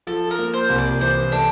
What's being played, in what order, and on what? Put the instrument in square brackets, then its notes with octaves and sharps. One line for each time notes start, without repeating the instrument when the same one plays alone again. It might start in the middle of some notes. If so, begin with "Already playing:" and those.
[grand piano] F3 [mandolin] A4
[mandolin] A#4
[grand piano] A#3
[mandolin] C5
[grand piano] C2
[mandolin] D5
[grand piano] E3 [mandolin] C5
[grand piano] A3 [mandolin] D4